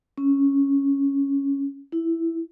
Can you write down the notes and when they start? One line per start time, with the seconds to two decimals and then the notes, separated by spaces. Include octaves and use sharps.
0.18 C#4
1.92 E4